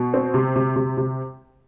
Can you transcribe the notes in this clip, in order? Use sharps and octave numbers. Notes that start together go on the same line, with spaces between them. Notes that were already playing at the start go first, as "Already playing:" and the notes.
Already playing: B2
C4
C3
C3
C3
C3